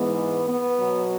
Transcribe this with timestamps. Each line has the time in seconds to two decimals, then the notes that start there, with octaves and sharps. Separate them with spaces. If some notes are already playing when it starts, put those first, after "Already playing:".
Already playing: G#2 E3 G#3 B3
0.49 B3
0.77 B2 F#3